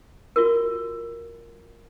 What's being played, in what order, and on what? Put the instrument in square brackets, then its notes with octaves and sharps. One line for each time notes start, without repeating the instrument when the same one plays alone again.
[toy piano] F4 F#4 A#4